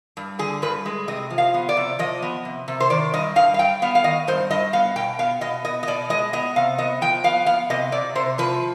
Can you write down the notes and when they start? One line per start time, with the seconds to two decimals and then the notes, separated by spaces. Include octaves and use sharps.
0.17 G2
0.39 D3 G#4
0.62 G2 B4
0.86 G#3
1.08 C3 D#5
1.30 F3
1.38 F5
1.54 B3
1.69 D5
1.77 C3
1.99 F3 D#5
2.22 B3
2.45 C3
2.68 C3
2.80 C5
2.90 D#3 D5
3.14 G2 D#5
3.36 G2 F5
3.54 F5
3.59 G2 G5
3.82 B3 F5
3.95 F5
4.04 D#3 D#5
4.27 G2 C5
4.50 G2 D#5
4.73 B3 F5
4.96 B2 G5
5.19 B3 F5
5.41 B2 D#5
5.64 B3 D#5
5.83 D#5
5.87 B2 D5
6.10 G#3 D#5
6.33 B3 D#5
6.56 C3 F5
6.78 B3 D#5
7.01 F3 G5
7.24 B3 F5
7.46 B3 F5
7.70 C3 D#5
7.92 C3 D5
8.15 C3 C5
8.38 F3 B4